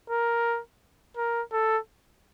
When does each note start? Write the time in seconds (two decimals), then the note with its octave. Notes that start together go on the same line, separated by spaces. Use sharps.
0.10 A#4
1.17 A#4
1.53 A4